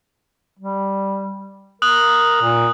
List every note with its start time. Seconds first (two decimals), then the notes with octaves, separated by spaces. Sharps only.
0.59 G3
1.82 A#4 D#6 F#6 F#7
2.41 A#2